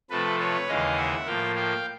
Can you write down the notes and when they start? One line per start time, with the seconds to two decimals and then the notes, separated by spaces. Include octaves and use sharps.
0.10 C3 F3 A3 A4 B4
0.40 B4 C#5
0.68 D#2 C#3 E3 G#3 D#5 F5
0.97 E5 F#5
1.27 A2 F3 A#3 F5 G5
1.55 F5 G5